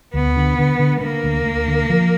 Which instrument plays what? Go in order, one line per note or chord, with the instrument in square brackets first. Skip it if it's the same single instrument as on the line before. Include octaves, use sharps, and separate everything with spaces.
[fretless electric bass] D2 [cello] B3
[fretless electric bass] D3
D3
D3
[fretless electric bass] D3 [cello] A#3
[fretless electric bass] D2
D2
D3
F3